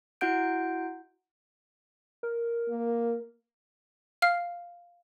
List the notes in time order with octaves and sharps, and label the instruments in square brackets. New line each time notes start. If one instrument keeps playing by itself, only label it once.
[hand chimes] E4 F#4 F#5 G6 D7
[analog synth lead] A#4
[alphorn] A#3
[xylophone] F5 F6 C7